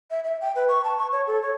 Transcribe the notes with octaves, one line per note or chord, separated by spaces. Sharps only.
E5
E5
G5
B4
C#6
A5
C#6
C#5
A4
C#5